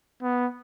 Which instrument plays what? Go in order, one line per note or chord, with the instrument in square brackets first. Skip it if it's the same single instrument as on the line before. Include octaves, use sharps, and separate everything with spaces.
[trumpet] B3